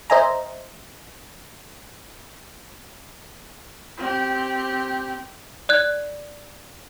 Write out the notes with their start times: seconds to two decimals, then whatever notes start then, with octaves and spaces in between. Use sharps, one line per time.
0.10 C5 D#5 E5 G#5 A#5
3.97 C4 G4
5.69 D5 F#6 G#6